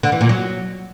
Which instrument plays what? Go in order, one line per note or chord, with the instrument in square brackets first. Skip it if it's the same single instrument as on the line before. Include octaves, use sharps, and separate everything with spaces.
[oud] D3
E3
A#2
F#3